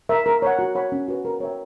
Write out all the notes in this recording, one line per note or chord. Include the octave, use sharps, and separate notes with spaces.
A#4 E5
A#4
C#5 F#5
F#4
C#5 F#5 B5
C#4
F#4 B4
A#4
C#5 E5 G5